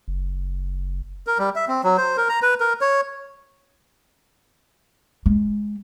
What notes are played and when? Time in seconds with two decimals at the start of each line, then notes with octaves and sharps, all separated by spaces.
0.08 F#1
1.27 A#4
1.38 G3
1.55 E5
1.68 C4
1.84 F#3
1.98 C5
2.17 A#4
2.29 A#5
2.42 B4
2.60 A#4
2.81 C#5
5.26 G#3